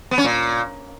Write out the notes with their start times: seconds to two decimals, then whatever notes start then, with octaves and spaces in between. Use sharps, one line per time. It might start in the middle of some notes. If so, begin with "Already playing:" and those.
0.11 B3
0.18 C#4
0.24 A#2